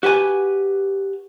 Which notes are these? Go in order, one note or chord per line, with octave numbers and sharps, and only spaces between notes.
F#4 G4 B4 G#5